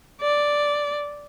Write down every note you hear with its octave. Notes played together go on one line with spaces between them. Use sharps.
D5